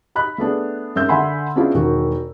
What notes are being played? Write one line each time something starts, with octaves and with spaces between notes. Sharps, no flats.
D#5 B5 F#6
A3 B3 D4 G#4
F#2 G#3 E5 E6 G6
D3 E5 F#5 G#5 B5 C6
B3 C#4 D4 E4 F4 G#4
E1 D#3 F#4